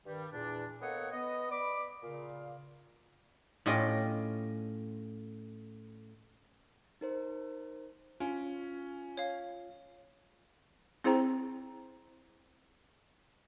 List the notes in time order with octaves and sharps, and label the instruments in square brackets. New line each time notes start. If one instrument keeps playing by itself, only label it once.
[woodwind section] G2 D#3 G3
E2 A#2 D4
A#3 B3 A4 C#5 D#5 F#5
B3 D#5
B4 D5 B5 D6
A#2 C#3 F5
[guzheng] A2 C#4 F4 G4 D#5 G5
[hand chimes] D#4 A#4 C5
[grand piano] C#4 [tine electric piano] F4
[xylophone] C#5 F5
[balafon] C4 E4 G#4 C5 G5 A#5